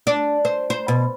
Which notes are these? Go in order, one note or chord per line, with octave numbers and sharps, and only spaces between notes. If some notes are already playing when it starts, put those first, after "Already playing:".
D4
C5
C5
B2